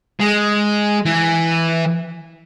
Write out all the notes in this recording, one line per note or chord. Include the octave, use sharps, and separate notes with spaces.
G#3
E3